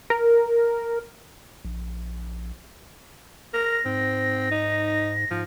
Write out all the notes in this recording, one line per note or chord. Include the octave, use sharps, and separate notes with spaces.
A#4
A#1
A#4 A#6
G#2 C4
D#4
G#2 F3